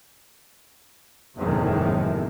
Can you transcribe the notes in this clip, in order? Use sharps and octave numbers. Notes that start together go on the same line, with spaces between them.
F#1 E2 A2 C3 D#3 G#3